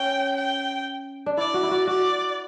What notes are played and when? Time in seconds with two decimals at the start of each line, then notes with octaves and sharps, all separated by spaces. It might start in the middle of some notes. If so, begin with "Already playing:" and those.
Already playing: C#4 G5
0.36 G5
1.26 D4
1.37 E4 D5
1.54 F#4
1.63 E4
1.71 F#4
1.87 F#4 D5